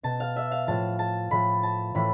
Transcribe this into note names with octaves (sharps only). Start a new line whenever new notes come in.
B2 A5
F5
E5
F5
A2 F3 A5
A5
A2 F3 B5
A5
A2 E3 B5